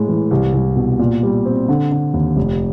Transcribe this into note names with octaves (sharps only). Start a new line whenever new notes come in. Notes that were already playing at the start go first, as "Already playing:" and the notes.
Already playing: A2 G#3
E3
C2
C2
B2
A#2
G3
C4
D3
D3
D#2
F1